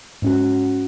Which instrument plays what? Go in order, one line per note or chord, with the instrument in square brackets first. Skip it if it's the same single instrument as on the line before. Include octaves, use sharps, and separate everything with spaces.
[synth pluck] G#2 C#4 F#4